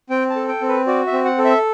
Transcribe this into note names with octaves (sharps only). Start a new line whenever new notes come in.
C4 G5
A5
A4
G5
C4
B4
F#4 D5
E5
C4
F#5
A4
E5